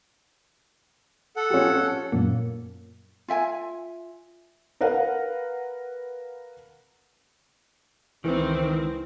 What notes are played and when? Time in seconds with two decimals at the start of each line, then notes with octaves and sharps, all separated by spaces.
1.36 A4 F#5
1.50 C#4 F4 G4
1.76 C#4
2.12 F#2 A#2 A#3
3.28 F4 E5 G5 G#5
4.81 A#4 B4 F5 F#5
8.24 C#2 D#3 E3 C4